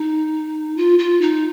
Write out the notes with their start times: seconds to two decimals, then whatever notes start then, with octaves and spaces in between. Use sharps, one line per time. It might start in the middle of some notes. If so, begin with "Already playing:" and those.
Already playing: D#4
0.77 F4
0.99 F4
1.21 D#4